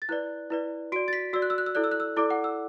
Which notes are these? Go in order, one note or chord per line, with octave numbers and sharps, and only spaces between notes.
A6
E4 B4 D5 F#6
E4 B4 D5
F#4 D5 D7
A6
B6
F#4 D5 E6
F#6
E6
F#6
E6
E4 A4 D5 F#6
E6
F#6
E6
E4 A4 D5 D6
F#5
E6